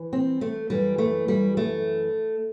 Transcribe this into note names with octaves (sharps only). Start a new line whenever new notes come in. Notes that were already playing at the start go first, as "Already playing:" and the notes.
Already playing: E3
C4
A3
F#2 E3 G3
A3
G3
A3